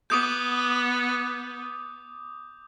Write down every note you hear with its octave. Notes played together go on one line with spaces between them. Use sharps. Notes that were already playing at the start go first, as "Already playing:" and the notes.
B3 D6 D#6 G6